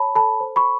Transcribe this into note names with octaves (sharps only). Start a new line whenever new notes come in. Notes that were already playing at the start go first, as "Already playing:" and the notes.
Already playing: C#5 A5 B5
A4 A5 B5
C5
B5 C#6